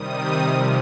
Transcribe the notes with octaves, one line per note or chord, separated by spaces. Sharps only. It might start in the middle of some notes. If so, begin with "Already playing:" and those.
Already playing: C3 D#3 G3 D#6
C3 F3 F6